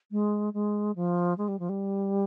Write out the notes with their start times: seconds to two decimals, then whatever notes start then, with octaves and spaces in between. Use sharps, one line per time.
0.11 G#3
0.54 G#3
0.96 F3
1.38 G#3
1.48 G3
1.59 F3
1.69 G3